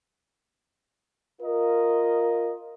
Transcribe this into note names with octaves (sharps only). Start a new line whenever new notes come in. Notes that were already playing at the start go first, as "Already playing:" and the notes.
F4 A#4 D#5